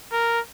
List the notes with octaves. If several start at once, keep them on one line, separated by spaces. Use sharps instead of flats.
A#4